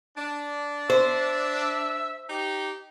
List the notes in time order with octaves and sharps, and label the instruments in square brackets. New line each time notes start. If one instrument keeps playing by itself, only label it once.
[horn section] D4
[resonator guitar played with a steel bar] C5 [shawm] E5
[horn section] D#4 G4